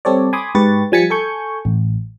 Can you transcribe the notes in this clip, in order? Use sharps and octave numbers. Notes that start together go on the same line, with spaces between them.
G3 C4 A4 C#5 D5
G#5 B5 C6 D6 D#6
G#2 G4 B4 C#6 A6
F3 G3 G#5 A6 B6 C#7
A4 G#5 C#6 G6
A1